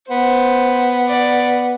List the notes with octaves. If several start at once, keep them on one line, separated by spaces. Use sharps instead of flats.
B3 C5
D5